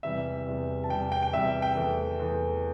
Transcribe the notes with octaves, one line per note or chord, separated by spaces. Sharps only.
E2 C3 E3 G3 E5
E2 C3 E3 G3
A5
E2 C3 E3 G3 G5
G5
G5
E2 C3 E3 G3 E5
G5
E2 E3 A3
E2 E3 A3